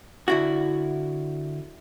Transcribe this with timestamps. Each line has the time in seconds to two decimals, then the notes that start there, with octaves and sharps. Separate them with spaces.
0.28 D3 E4 F#4